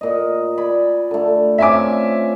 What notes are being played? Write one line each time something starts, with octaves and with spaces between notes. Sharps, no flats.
A#2 D#5
D5 G#5 B5
D3 A3
C4 C#4 F4 E5 G#5 D6